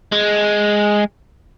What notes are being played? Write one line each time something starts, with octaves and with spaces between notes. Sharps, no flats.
G#3